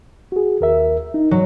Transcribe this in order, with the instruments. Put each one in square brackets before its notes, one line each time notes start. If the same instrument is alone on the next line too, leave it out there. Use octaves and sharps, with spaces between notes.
[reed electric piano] F#4 G#4
D#2 A#4 E5
D#4
[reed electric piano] G#2 [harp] F#3